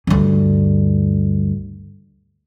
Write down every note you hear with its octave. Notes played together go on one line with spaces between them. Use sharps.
D2 G2